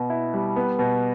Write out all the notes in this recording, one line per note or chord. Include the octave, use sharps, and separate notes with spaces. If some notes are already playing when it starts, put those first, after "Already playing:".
Already playing: B2 B3
E4
G3
B3
B2